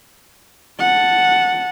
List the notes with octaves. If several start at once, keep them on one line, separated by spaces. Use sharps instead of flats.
F#5 A5